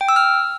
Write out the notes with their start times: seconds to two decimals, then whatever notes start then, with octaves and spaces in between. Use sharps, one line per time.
0.01 G5
0.09 E6
0.16 F6